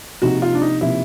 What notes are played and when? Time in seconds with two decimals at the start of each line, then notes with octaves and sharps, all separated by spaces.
0.22 C3 F3 A#3 D#4 F#4
0.42 F4
0.55 D4
0.62 D#4
0.81 C3 F3 A#3 D#4 E4